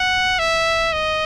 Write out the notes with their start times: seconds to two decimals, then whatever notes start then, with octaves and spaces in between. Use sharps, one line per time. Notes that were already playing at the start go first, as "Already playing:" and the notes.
Already playing: F#5
0.39 E5
0.93 D#5